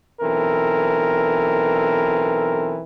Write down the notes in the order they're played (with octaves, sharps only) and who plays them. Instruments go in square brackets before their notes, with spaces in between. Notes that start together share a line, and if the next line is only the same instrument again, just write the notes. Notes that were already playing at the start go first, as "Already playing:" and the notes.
[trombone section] B1 E3 C4 A4 A#4